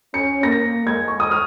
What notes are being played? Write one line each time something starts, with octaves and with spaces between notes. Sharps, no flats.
C#4 C#7
A#3 A#6
G#3 G#6
C#6
D#6
F6